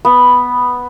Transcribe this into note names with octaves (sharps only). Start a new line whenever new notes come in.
B3